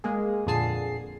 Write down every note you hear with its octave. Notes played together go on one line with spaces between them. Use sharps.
G#3 A#3 G#4
F2 A#2 D3 G#4 A5 C7